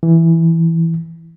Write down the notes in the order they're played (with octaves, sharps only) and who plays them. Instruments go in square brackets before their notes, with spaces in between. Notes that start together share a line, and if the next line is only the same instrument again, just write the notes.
[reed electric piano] E3